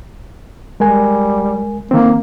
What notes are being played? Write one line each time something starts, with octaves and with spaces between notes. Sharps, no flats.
G3 G#3 A#4 G#5
D#3 A#3 C4